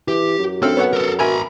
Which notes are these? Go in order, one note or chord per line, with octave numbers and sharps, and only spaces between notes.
E3 G4
F#2
C4 A4 E6 F6
B3 C#5 F#5
A4 A#4
B2 A#4 E5 G#5 A#5 B5